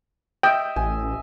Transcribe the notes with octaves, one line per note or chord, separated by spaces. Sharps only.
D#5 E5 G5
A1 G#5